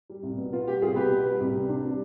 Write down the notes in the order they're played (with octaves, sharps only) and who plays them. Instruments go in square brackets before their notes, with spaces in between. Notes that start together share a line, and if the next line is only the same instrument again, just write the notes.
[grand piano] G3
C2
B2
B3 F4
G3 G4
C2 F4 G#4
B2 G4 B4
B3
G3
C2
C3
D4
G3